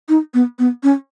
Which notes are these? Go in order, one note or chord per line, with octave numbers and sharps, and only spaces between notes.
D#4
B3
B3
C#4